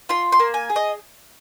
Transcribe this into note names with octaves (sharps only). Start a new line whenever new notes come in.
F4 C6
C6
A#3
G#5
G#4
D#5